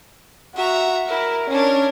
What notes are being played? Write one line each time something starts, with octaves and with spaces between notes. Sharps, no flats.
F#4 E5 A#5
E4 A#4
C#4 D4 A#4